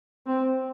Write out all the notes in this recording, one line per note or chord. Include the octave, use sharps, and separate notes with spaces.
C4